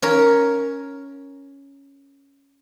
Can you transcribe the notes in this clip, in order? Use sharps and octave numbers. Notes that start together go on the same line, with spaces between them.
C#4 A#4 C#5